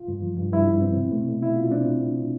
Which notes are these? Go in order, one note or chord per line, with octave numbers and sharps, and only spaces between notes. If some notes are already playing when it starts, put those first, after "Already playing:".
Already playing: F4
G2
F3
G2
G2 E4
G2
C4
B2
A3
B2
B2 E4
B2 F4
C4 D4